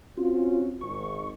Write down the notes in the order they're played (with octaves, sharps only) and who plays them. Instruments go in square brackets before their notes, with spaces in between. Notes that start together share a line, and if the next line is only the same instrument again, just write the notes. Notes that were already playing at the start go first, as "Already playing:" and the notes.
[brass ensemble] C4 C#4 F#4 [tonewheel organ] F4
[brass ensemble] G#1 [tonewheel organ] C#6